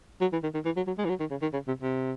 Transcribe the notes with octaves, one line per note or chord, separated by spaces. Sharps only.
F#3
E3
D#3
D#3
E3
F#3
F#3
G#3
E3
F#3
D#3
C#3
D#3
C#3
C3
C3